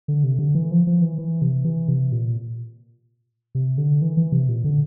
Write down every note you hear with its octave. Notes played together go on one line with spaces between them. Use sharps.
D3
C3
D3
E3
F3
F3
E3
E3
C3
E3
C3
A#2
C3
D3
E3
E3
C3
A#2
D3